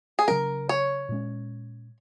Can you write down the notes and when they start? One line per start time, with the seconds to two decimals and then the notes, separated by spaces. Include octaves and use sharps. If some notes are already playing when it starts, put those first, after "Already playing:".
0.19 G#4
0.28 C#3 F#3 C#4 A#4
0.69 C#5
1.09 A#2 G#3 C#4